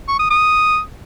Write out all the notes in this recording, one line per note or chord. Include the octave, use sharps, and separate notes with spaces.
C#6
D#6
D#6